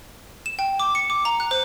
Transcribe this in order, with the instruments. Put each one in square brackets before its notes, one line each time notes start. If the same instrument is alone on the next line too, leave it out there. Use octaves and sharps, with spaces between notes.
[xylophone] E7
G5
D6
C#7
D6
A#5
F#6
C5